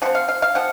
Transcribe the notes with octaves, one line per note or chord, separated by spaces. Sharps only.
F3 C4 F#5
F5
F5
F5
F3 C4 F#5